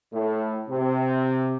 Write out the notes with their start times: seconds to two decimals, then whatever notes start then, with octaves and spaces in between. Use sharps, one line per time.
0.13 A2
0.69 C3